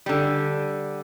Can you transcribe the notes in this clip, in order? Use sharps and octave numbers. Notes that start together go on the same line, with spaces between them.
D3 G3